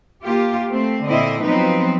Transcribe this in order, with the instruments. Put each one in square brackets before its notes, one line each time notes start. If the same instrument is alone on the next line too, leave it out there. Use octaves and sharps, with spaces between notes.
[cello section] A#3 F4 G4
A3 C4
A#2 D3 C4 E4 D#5
F3 F#3 B3 C4 D#4 B4